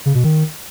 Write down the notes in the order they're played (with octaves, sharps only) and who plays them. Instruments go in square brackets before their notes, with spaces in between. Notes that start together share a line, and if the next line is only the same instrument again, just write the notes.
[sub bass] C#3
B2
D#3